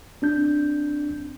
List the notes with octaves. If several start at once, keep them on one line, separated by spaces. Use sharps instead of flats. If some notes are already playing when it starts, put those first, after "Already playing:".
C4 D4 G6